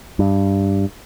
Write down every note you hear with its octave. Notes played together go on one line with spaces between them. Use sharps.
G2